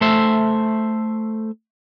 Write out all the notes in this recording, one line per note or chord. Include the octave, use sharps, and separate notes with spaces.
A3 C5 E5